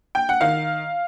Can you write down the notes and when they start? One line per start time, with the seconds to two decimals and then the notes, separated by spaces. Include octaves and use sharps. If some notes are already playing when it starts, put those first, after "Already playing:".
0.15 G5
0.29 F#5
0.41 D#3 F5